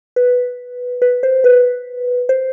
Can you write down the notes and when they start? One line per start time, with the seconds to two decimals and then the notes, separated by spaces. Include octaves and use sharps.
0.16 B4
1.02 B4
1.23 C5
1.44 B4
2.29 C5